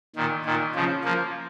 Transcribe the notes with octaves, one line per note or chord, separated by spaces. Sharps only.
A#2 D#3
A#2 D#3
C#3 F3
F3 A#3